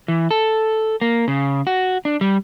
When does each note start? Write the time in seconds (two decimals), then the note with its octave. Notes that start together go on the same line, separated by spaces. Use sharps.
0.08 E3
0.31 A4
1.01 A#3
1.28 C#3
1.67 F#4
2.05 D4
2.21 G3